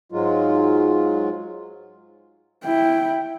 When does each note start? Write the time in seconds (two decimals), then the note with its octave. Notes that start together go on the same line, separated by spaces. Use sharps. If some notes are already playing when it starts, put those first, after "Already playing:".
0.12 G#2 F#3 G#3 F4
2.64 E4 G5